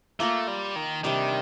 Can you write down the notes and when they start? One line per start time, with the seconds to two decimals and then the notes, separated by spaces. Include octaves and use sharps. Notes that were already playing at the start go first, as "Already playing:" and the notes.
0.20 A3 A#3 F4 A#4
0.48 G3
0.76 D#3
1.04 C3 D#3 G3 D4